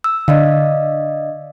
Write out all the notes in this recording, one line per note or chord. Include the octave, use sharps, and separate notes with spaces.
E6
D3 D5 D#5 F5